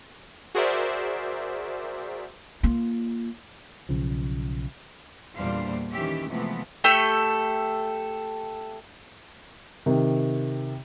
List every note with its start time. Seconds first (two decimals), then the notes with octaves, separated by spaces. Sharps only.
0.55 F#4 G#4 A#4 C5 D5 E5
2.63 A#3 F4
3.89 B1 C#3 F3
5.37 E2 A#2 G3 D4 C5 F5
5.91 D#3 E3 C#4 G4 E5
6.27 C3 E3 F3 G#3 A3 B3
6.84 A3 G4 A4
9.86 C3 D#3